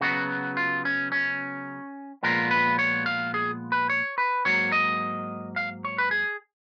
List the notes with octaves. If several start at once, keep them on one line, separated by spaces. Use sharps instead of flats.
C#3 F#3 B3 F#4
F4
C#4
C#4
A#2 F3 G#3 B3 A#4
B4
C#5
F5
G#4
B4
C#5
B4
G#2 F#3 A#3 C#5
D#5
F5
C#5
B4
G#4